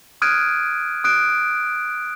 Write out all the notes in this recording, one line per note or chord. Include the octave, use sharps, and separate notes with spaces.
D#6 F6 F#6 G#6 D7 D#7
D#6 F#6 D7